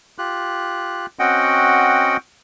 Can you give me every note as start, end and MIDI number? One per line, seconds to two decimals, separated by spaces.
0.18 1.06 65
0.18 1.06 67
0.18 1.06 90
1.19 2.17 60
1.19 2.17 61
1.19 2.17 66
1.19 2.17 75
1.19 2.17 78
1.19 2.17 79